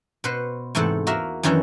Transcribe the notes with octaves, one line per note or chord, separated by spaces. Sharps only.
B2 F#4 B4 C5
E2 G#2 C3 A3 A4 F#5
A#3 F#4 A#4 E5
F#2 D#3 E3 C#4 D4 E4